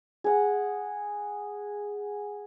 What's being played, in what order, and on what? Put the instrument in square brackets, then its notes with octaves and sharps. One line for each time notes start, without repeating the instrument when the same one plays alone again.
[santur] G#4 F#5